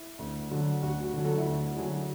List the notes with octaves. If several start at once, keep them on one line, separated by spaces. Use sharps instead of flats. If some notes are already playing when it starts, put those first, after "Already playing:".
Already playing: E4
D2
D3 F#3
D2 F#4
F#4
D3 F#3
F#4 A4
E4
D2 F#4
D3 F#3 E4 G#4